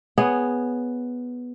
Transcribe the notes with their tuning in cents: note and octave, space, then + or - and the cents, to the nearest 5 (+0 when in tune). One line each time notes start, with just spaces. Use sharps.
B3 +0 G#4 +0 C#5 +10